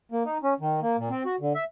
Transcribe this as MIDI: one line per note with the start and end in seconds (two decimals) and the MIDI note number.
0.12 0.23 58
0.25 0.38 63
0.43 0.54 61
0.60 0.80 51
0.82 0.97 58
0.98 1.09 46
1.10 1.23 60
1.26 1.36 66
1.40 1.53 50
1.55 1.64 76